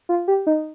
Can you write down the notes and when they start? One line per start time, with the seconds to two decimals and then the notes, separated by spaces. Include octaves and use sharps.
0.09 F4
0.28 G4
0.47 D#4